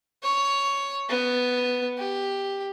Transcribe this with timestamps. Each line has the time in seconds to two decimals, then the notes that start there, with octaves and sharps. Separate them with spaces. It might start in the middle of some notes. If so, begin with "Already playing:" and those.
0.23 C#5
1.09 B3
1.98 G4